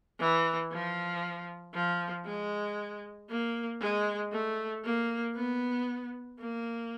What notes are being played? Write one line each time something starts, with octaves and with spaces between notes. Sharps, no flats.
E3
F3
F3
G#3
A#3
G#3
A3
A#3
B3
A#3